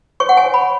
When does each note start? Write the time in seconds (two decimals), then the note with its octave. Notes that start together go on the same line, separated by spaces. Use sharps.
0.20 C#5 C#6
0.29 F#5
0.37 G#5
0.46 C#5
0.54 B5